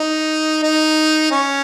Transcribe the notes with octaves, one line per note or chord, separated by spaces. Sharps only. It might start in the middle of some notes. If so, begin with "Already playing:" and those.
Already playing: D#4
D#4
C#4